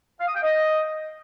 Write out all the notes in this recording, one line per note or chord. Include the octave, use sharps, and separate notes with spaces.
F5
D#6
G5
D#5